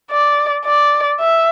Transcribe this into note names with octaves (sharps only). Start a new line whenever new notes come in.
D5
D5
E5